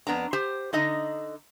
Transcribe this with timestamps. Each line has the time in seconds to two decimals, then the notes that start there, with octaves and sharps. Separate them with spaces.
0.07 F2 B3 D4 A#5
0.33 G4 C5
0.73 D3 D#4 D#5 A#5